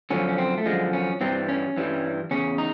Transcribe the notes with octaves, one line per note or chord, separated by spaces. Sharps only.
F#2 D3 F3 C#4
C#4
C4
A3
F#2 D3 F3 G#3
C#4
G2 E3 G3 C4
C#4
G2 E3 G3
E2 C#3 C#4
D#4